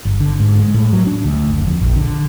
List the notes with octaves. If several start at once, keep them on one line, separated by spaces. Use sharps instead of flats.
G1
D3
G#2
G#3
A2
F#3
D4
D2
F#1
F2
A#1
D3